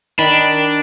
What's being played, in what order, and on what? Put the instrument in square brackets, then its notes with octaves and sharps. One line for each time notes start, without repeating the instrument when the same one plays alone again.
[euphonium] D#3 [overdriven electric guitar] D4 [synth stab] B5 D7